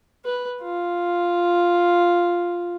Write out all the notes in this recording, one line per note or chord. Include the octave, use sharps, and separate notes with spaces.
B4
F4